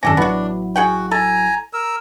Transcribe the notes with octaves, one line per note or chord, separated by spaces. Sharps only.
G#1 F#2 C#4 D4 G4 A4 A#6
A1 F#3 B3 E4 F#4
F#4 G#4 F#5 G5
A4 G#5 A#5
A#4 E6